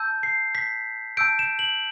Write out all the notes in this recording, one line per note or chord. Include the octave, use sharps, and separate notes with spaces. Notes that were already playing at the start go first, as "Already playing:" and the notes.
Already playing: A5 E6 G6
C7
B6
A5 E6 G6 D7
E7
F#7